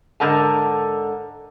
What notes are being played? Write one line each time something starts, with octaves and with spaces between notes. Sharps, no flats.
G#2 D3 A#4 F#5 A5